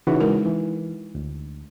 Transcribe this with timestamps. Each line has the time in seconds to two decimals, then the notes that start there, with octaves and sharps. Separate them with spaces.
0.07 C#3 E3 D#4 E4 F#4
0.20 G#3 A#4
0.46 E3
1.15 D2